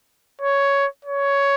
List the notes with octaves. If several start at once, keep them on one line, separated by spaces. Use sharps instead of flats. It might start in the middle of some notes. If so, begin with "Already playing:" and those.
C#5
C#5